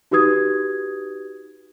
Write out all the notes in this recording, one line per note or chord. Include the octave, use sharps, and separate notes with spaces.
D#4 F#4 G4 B4 D#6 G#6